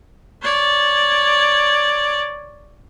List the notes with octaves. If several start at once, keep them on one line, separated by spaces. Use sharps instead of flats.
C#5 D5